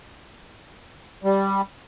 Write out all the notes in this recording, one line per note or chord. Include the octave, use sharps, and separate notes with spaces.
G3